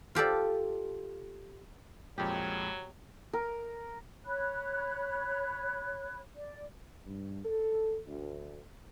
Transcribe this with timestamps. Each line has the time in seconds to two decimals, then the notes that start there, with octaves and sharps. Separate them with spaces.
0.15 F4 G4 A4 D5
2.18 F2 A#2 F#3 G#3 G4
3.33 A#4
4.23 C#5 B5 F#6
6.36 D5
7.06 G2
7.45 A4
8.06 D2